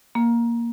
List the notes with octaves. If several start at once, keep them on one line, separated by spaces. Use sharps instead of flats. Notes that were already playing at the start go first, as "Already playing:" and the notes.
A#3